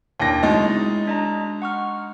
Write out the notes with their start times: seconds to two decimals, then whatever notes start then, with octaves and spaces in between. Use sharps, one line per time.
0.20 D#2 D4 E4 C#5 A#6
0.43 F#3 G#3 D#4 E4 A6
1.07 D4 D#5 A#5
1.62 F#5 C#6 F6